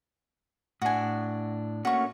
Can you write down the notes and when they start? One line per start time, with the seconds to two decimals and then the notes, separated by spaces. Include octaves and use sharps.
0.82 A2 D4 F#4 G#5
1.85 A3 A#3 C#4 F#4 C#6